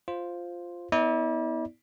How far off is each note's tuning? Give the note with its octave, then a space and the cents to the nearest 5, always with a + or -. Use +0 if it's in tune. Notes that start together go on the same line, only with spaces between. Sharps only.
F4 +0 C5 +0
B3 +0 E4 -40 D5 +0